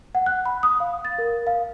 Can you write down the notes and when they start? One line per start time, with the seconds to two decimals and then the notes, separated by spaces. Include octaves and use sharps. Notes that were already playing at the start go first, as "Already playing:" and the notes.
0.15 F#5
0.26 F#6
0.46 B5
0.63 D#6
0.80 F5
1.05 A6
1.18 A#4
1.47 F5